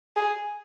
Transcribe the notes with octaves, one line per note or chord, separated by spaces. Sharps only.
G#4